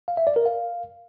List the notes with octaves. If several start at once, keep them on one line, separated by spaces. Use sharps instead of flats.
F5
E5
D5
A#4
F5